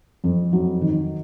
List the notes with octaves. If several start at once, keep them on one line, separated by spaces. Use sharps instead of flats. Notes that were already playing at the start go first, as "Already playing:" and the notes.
F2
F#3
D#3